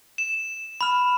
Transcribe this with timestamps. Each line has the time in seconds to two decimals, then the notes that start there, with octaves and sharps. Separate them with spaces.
0.18 E7
0.81 B5 F6